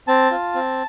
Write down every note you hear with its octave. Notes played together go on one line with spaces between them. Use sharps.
C4 A5
F4
C4